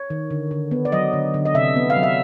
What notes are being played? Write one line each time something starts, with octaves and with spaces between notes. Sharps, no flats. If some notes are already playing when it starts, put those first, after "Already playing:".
Already playing: C#5
D#3
D3
D3
B3
D5
F#3 D#5
D3
D3
D#5
C3 E5
B3
F5
F#3
E5